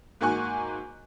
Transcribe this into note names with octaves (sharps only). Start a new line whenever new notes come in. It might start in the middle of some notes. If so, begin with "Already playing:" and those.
G#2 A#3 F#4 G#5 C#6 F#6